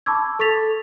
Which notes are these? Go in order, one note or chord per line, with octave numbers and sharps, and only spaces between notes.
A5 B5 C#6 D6 E6 G#6
A4 C#6 A6 B6 F7